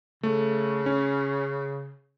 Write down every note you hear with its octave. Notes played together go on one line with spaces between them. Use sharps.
C#3 A3
C#4